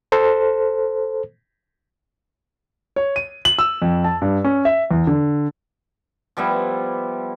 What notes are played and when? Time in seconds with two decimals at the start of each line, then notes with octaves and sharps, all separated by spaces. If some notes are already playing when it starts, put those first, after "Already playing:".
0.12 A4 C5
2.96 C#5
3.16 D#7
3.45 F#7
3.59 E6
3.82 F2
4.04 A5
4.22 G2
4.44 C#4
4.65 E5
4.91 E2
5.07 D3
6.37 F3 G3 B3 E4